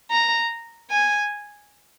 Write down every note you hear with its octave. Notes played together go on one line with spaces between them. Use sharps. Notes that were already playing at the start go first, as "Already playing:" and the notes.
A#5
G#5